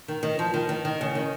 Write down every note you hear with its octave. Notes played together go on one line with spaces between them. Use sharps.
D#3
D#3
F3
D#3
D#3
D#3
C#3
D#3